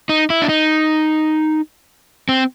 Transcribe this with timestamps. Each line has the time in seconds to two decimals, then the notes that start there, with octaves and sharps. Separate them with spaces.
0.09 D#4
0.30 E4
0.42 D4
0.49 D#4
2.29 C4